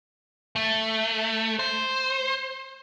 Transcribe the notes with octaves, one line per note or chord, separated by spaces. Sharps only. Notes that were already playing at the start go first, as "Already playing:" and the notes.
A3
C5